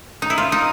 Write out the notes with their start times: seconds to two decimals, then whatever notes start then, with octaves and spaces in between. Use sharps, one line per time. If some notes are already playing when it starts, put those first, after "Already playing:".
0.22 D#4
0.30 E4
0.38 F4
0.52 D#4